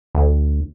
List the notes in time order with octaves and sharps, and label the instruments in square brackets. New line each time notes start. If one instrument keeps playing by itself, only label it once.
[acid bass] D2